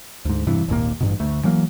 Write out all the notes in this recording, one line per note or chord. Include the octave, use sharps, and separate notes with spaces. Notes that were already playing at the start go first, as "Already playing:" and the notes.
D2 G#2
E1 G2 C3 E3
G#1 D#2 A#2 A#3
A1 G2 B2
D2 A3
E3 F#3 A#3